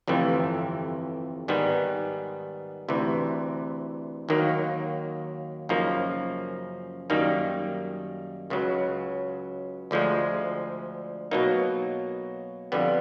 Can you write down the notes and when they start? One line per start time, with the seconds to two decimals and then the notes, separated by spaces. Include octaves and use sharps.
0.08 G1 F2 C3 E3 A3
1.48 G#2 D#3 G3 B3
2.89 D2 C3 E3
4.29 D#2 D#3 F#3 A#3
5.69 F#2 C#3 F3 A#3 D#4
7.10 F#2 D#3 G3 A#3 D#4
8.50 C#2 C#3 F#3
9.91 D2 D3 F3 G#3
11.31 B2 F#3 A#3 D#4
12.72 F2 D3 G3 B3